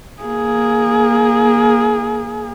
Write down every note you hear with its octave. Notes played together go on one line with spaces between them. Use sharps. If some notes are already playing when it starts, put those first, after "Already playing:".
A#3 G#4